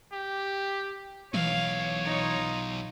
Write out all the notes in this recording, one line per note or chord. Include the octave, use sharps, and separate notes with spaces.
G4
B1 E3 C#5 F5
D#4 F4